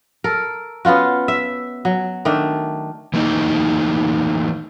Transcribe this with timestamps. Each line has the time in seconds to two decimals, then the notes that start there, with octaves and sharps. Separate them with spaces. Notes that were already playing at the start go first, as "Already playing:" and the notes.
0.24 A4 A#4
0.85 B3 C#4 F4 F#4
1.28 E5
1.85 F#3
2.25 D#3 A3 D4
3.13 E3 A3 A#3 D#4 D#5